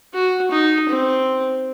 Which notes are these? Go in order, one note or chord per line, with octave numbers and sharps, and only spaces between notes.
F#4
D#4
C4